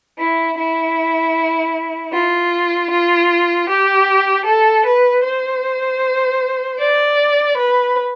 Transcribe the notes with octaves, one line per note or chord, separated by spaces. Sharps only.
E4
E4
F4
F4
G4
A4
B4
C5
D5
B4